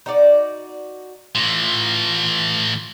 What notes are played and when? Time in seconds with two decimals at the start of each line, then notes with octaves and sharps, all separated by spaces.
0.06 D#4 F#4 D5
1.35 A2 E3 F4